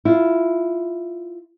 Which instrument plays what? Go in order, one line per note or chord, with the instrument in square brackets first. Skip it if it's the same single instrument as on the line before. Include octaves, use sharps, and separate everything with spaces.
[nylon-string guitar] E4 F4